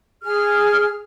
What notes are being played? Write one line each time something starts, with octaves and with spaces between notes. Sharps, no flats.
G#4 F6